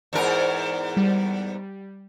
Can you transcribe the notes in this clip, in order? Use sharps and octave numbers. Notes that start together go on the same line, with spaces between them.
E2 G#2 A#4
G3